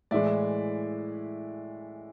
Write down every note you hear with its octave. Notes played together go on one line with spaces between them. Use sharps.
A2 E3 G#3 D5 E5